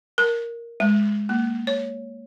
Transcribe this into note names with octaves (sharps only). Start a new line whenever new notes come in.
A#4
G#3
A#3
C#5